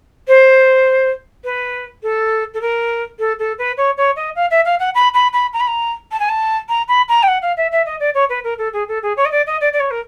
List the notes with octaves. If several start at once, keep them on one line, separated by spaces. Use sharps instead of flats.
C5
B4
A4
A4
A#4
A4
A4
B4
C#5
C#5
D#5
F5
E5
F5
F#5
B5
B5
B5
A#5
B5
A#5
A5
G#5
A5
A#5
B5
A#5
G5
F#5
F5
E5
E5
D#5
D5
C#5
B4
A#4
A4
G#4
A4
G#4
C#5
D#5
D5
D#5
D5
D5
C#5
A#4